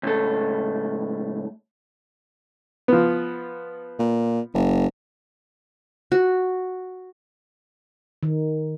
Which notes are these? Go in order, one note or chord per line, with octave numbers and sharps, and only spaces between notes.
C#2 A2 A4
F3 B3
A#2
F#1
F#4
D#3